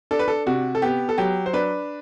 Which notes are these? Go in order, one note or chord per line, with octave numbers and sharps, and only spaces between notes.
D4 A4
B4
A4
C3 F#4
A4
B3 G4
A4
F#3 G4
C5
D4 B4